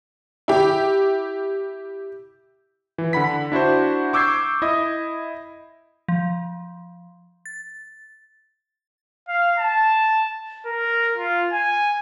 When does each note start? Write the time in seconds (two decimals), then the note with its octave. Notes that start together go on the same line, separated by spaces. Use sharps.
0.48 E4 G4
2.98 E3
3.13 D3 F#5 B5 B6
3.52 D4 E4 F#4 C5
4.13 C#6 D6 E6 G6 G#6 C7
4.62 E4 D#5 D#6
6.08 F3
7.46 A6
9.28 F5
9.59 A5
10.66 A#4
11.16 F4
11.53 G#5